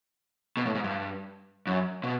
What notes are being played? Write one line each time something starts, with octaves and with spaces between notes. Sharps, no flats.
B2
A2
G#2
G2
F#2
B2